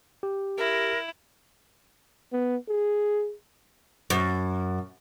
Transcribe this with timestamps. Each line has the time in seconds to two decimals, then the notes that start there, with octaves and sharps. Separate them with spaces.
0.23 G4
0.58 E4 A#4
2.32 B3
2.68 G#4
4.10 F#2